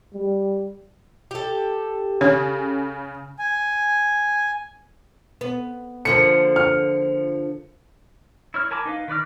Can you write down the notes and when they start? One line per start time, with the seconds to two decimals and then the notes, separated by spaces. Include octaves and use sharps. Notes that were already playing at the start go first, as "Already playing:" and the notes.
0.14 G3
1.31 G4 A4
2.21 C#3 C#5
3.39 G#5
5.41 B3
6.05 D3 F3 A#3 C#7
6.56 F6
8.54 E4 C#5 F6
8.71 A#4 G#5 A5 B5 D6
8.85 D#4 B4 F5
9.08 D#3 B4 D5 F6